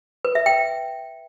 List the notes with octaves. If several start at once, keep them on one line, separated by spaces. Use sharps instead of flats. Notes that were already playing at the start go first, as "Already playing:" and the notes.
B4
E5
G5